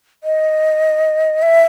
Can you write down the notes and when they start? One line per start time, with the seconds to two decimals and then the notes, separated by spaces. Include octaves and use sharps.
0.24 D#5
1.42 E5